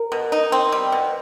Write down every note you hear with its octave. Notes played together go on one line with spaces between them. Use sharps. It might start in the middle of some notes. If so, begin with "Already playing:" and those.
Already playing: A#4
B2
D#4
C4
G3
B2